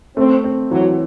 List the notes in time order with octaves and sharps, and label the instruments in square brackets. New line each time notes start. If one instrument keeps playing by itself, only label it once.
[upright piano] A3 [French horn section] C4
[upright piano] C4
[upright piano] E3 [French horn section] F#3